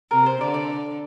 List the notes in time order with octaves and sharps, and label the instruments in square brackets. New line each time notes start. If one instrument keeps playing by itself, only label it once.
[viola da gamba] C3 [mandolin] A#4
[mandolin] C5
[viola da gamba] D3 [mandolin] D5
[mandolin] D5